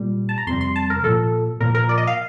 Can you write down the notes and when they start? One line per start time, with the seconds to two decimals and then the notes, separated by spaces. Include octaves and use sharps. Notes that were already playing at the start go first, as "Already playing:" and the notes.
Already playing: A#2 G3
0.29 A5
0.38 A#5
0.47 F2 C3 G3 C6
0.61 C6
0.76 A5
0.90 A#4
1.03 A#2 F3 A4
1.60 A#2 F3 A#4
1.75 A#4
1.89 D5
1.98 D#5
2.07 F5